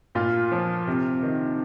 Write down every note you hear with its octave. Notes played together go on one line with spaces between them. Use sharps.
A#2 F4
F3
C3
D#3